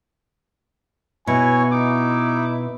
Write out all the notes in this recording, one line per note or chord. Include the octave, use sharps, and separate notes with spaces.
B2 E4 C#5 G#5 C#6
D#4 E4 D6